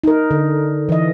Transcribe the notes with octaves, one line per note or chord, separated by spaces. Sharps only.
D#4 A#4
D3
E3 D#5